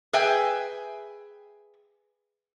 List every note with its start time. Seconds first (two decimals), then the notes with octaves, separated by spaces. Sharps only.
0.13 G#4 B4 E5 G5 G#5